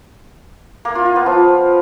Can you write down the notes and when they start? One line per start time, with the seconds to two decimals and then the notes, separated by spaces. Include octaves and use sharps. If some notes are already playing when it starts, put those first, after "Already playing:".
0.85 A#3
0.95 F4
1.06 F4
1.16 B3
1.26 F3